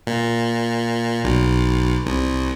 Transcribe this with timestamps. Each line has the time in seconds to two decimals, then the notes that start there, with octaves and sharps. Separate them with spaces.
0.07 A#2
1.24 B1
2.06 C2